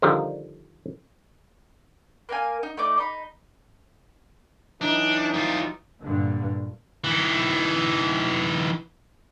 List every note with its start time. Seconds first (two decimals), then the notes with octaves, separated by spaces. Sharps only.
0.02 D3 D#3 F3 G3 A#4
2.29 A#3 A#4 F5 G#5
2.63 D#4
2.77 A3 D#4 D5 D6
2.98 D#4 B5
4.81 E3 F#3 D4 D#4
5.35 G3 F4
6.00 G2 A#2 D3
7.04 E3 D#4